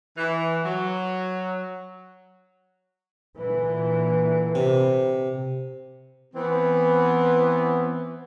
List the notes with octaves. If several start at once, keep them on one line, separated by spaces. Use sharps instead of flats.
E3
F#3
A#2 D3 E3
C3
E3 B3 C4